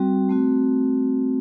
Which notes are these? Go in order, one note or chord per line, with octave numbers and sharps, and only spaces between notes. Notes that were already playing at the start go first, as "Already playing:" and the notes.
Already playing: G3 C4 F#4
A3 C4 F#4